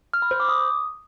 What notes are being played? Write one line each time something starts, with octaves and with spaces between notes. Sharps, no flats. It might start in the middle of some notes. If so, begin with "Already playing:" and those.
F6
B5
C5
D6
D#6